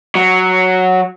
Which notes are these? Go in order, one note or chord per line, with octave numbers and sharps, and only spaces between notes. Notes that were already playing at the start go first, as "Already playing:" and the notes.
F#3